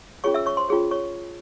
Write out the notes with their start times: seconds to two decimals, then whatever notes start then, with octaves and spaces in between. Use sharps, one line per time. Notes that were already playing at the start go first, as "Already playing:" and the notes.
0.24 C#4 F4 G#4 C#5 C#6
0.34 E5 E6
0.46 C#5 C#6
0.57 C5 C6
0.69 C#4 F4 G#4 C#5
0.91 C#5 C#6